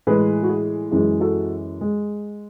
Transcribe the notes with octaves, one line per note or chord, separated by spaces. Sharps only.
A2 E3 G#3 G#4 B4
F#4
G#4
F#2 E3 G#3 G#4
F#4 A4
G#3